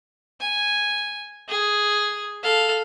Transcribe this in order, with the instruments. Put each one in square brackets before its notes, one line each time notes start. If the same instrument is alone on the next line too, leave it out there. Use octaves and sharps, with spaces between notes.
[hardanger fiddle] G#5
G#4
A4 F5